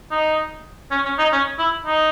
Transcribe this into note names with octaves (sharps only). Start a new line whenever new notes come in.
D#4
C#4
C#4
D#4
C#4
E4
D#4